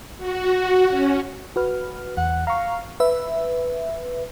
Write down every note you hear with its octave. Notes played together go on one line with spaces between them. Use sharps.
F#4
C#4
F#4 B4 F6
E2 F#5
F5 A#5 C#6
B4 E5